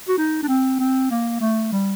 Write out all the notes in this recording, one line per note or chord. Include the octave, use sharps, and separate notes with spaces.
F#4
D#4
D4
C4
C4
A#3
A3
G3